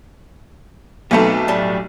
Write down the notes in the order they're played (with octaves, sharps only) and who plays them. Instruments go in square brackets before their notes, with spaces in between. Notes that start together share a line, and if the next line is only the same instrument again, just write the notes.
[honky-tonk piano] B1 A3 A4 [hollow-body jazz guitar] B3 C4 D#4
[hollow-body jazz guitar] A2 G3 A5